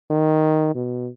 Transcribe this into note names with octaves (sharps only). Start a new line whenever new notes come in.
D#3
B2